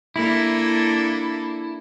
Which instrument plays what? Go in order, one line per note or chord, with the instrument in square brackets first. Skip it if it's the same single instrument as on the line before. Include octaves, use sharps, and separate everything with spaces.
[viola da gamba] A#3 D4 A4 [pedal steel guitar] E4